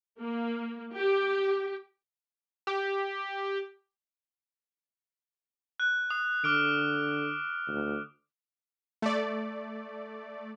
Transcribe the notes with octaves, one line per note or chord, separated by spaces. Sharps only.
A#3
G4
G4
F#6
D#6
D3 D6 F6 D7
D2
A3 D5